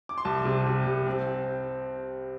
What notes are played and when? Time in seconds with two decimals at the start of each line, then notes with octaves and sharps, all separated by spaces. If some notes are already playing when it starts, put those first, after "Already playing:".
0.09 D6
0.18 C6
0.25 C2 A5
0.45 C3
0.66 C3
0.86 C2
1.06 C4
1.27 C4